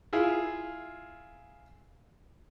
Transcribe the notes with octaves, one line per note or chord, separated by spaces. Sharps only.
E4 F4 G#4